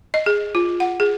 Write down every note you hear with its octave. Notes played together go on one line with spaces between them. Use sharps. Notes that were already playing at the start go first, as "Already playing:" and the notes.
D#5
G#4
F4
F#5
G#4